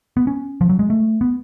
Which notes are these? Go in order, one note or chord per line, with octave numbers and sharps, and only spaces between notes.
B3
C#4
F3
F#3
G#3
A3
B3